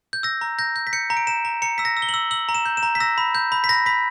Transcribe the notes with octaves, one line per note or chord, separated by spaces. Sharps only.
G6
E6 A#6
A#5
G6 A#6
G6
B6
G6 C#7
A#5
D7
A#5 E7
A#5
A#5 C#7
E6 B6
A#6
E6
G7
F#7
E6
E6 F#7
A#5
E7
G6
E7
A#5
B6
E6 A#6
B5
G6
B5
B6
B5 A#6
B5 B6